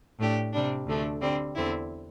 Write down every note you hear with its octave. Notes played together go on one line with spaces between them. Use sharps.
A2 A3 D4 G4
C3 G3 D4
D2 D3 A3 D4
D3 G3 C4
E2 D3 C4 E4